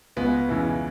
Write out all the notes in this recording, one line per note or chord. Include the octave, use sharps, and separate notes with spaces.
C#2 B3
C#3 E3